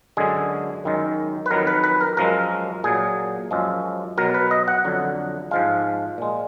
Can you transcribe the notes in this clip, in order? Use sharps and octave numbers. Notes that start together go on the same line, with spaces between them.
F#2 D3 G#3 G#4
F#2 D#3 G#3
B4
F2 D#3 F#3 A#4
B4
B4
A#4
F#2 F3 G#3 A#4
A#2 F#3 G#4
F#2 F3 G#3
B2 F#3 A#4
B4
D#5
F#5
F2 D3 F#3
G#2 F3 G#3 F5
A#2 G#3